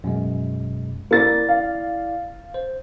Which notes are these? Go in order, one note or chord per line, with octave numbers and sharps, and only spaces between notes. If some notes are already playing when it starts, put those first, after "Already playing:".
F#2 B2 G#3
A#3 E4 D5 A6
F5
C5